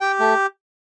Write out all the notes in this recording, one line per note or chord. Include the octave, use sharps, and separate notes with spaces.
G4 G5
A3